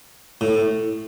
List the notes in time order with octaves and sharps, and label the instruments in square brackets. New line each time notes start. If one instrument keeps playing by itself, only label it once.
[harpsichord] A2